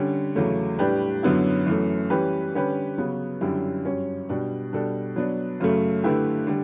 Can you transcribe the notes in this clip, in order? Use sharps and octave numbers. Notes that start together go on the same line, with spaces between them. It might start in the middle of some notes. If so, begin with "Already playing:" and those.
Already playing: D3 G3 C#4
E2 C#3 F#3 A3
A2 G3 D4 G4 B4
F#2 D3 F#3 B3 E4
F#2 E3 A3
E3 G3 C#4 G4 B4
D3 G3 C#4 G4 B4
C#3 F#3 B3
F#2 D3 G3 C#4 E4
G2 F#3 C#4
B2 G3 D4
B2 G3 D4 A4
F#3 B3 D4
F#2 C#3 F#3 A3
D3 A3 E4 G4 B4
D3 G3